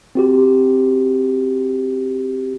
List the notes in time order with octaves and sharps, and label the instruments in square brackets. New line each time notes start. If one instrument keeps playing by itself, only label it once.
[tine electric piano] C4 F#4 G4